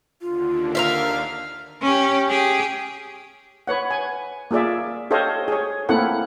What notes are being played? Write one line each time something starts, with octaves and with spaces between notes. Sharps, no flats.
D#2 D3 F4
A#4 C5 E5 F5
C#4 G4
G4 G#4
B4 C#5 F#5
G#5
A#3 F4 G#4 D5 E5
G4 A4 C5 C#5 D#5 F5
G#4 C#5
A3 A#3 C4 E4 A4 F#5